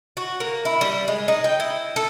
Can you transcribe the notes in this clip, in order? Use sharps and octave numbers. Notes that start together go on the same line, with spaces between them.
F#4
A#3
E4
G3
G#3
D#4
G5
E4
A4